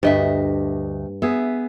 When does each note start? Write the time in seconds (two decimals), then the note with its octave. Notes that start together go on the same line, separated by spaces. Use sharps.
0.03 D2 G2 D#5 E5
1.22 B3 G#4 E5